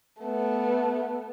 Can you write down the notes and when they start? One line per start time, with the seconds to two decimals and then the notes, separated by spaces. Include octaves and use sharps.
0.22 A3 B3